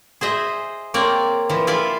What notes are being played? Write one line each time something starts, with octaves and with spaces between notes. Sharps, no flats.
G#4 C5 D#5 E5
A#3 C4 C#5 D5
E3 F3
E4 F4 D5 E5 F5